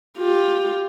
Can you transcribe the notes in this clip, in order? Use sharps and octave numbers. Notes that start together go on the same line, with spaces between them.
F4 G4